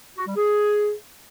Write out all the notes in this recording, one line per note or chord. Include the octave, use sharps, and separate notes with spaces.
F#4
G3
G#4